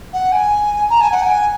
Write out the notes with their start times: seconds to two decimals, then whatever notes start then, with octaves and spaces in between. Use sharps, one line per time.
0.13 F#5
0.31 G#5
0.89 A#5
1.00 G#5
1.11 F#5
1.22 G#5